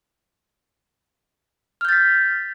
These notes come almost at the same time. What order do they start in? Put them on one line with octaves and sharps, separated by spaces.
F6 G6 A6 B6